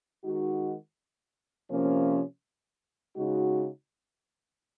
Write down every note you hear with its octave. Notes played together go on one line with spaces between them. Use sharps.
D#3 G#3 D#4 F#4
C3 F3 A#3 C#4
C#3 G#3 D#4 F#4